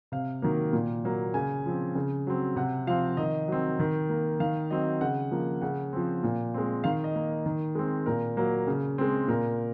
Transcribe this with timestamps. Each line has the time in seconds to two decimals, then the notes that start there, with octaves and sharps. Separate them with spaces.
0.12 C3 F5
0.42 D#3 F#3 A#3
0.73 A#2
1.04 F#3 A#3
1.34 C#3 G#5
1.66 F3 C4
1.95 C#3
2.27 F#3 C4
2.56 C3 F#5
2.87 F3 C4 F5
3.17 D#3 D#5
3.48 F#3 C4
3.79 D#3
4.09 A#3
4.40 D#3 F5
4.71 F#3 C4 D#5
5.01 C#3 F#5
5.31 F3 A#3
5.62 C#3 F#5
5.93 F3 C4
6.23 A#2
6.54 G#3 C4
6.84 D#3 F5
7.04 D#5
7.15 A#3
7.46 D#3
7.75 G#3 C4
8.06 A#2 A#4
8.37 F#3 A#3
8.67 C#3
8.98 G#3 C4
9.28 A#2 A#4